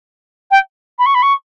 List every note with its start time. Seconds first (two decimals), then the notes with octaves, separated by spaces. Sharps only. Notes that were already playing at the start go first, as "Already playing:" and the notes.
0.51 G5
0.98 B5
1.06 C#6
1.14 B5
1.22 C#6